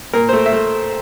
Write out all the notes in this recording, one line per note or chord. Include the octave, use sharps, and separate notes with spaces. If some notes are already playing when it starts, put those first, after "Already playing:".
A#2 A#4
A3 C5
E5
A3